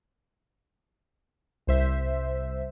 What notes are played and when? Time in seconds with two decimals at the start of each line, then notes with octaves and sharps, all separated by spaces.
1.67 C2 C5 E5